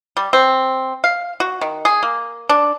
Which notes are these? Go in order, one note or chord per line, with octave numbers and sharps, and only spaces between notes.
G3
C4
F5
F#4
D#3
G#4
A#3
D4